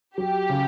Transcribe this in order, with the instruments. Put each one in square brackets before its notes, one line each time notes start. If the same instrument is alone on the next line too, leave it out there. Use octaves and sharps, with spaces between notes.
[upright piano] F#3 [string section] G4
[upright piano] C#3